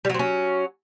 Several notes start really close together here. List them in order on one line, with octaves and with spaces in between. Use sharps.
G3 F#3 C4 C#4